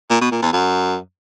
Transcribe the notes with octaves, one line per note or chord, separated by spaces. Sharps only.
A#2
B2
A#2
E2
F#2